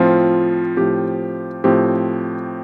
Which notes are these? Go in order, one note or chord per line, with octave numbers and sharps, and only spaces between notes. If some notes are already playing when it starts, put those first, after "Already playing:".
Already playing: A2 F3 C4 F4
A2 F3 C4 G4
A2 F3 C4 G4